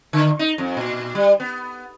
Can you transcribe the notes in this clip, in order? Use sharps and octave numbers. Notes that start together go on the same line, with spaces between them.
D3
D#4
F2
A#2
G3
B3